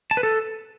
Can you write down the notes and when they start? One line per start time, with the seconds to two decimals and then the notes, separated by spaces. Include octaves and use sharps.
0.11 A5
0.17 B4
0.23 A4